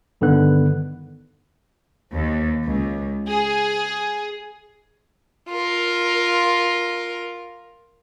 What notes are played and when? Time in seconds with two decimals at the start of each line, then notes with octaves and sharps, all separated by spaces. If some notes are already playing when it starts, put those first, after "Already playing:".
0.21 G2 D3 D#3 B3 F#6
2.11 D#2
2.64 C#2
3.28 G#4
5.49 F4 A#4